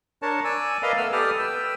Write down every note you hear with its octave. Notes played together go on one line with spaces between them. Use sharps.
D4 A#4 C#5 A5
D5 G#5 E6
A#4 B4 D5 D#5 F5 A#5
A3 B3 E6 F6
G4 A4 B4 D5 D#6 F6
B4 G5 E6